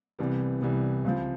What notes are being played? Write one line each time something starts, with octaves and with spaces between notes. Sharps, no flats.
C2 C3 E3 G3 B3
C2 C3 E3 G3 B3
C#2 C3 F3